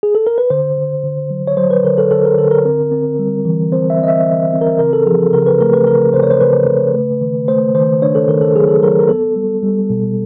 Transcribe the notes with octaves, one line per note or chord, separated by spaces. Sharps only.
G#4
A4
A#4
B4
D3 C5
D3
D3
F#3
C#5
F#3 C5
B4
D3 A#4
A4
D3 A4
A#4
D3 A4
A#4
C4
C4
G3
E3
C4 C5
E5
C4 D#5
E5
E3
C4
A#4
C#3 A#4
A4
F3 G#4
A4
C#3 A#4
B4
A3 A#4
B4
C#3 A#4
C#3 C5
C#5
C5
C#3 B4
C#3
A3
D#3
A3 C5
D#3 C5
D4 C#5
A4
D#3 A#4
A4
F#3 G#4
A4
F#3 A#4
A#4
B3 A4
G3
G3
B2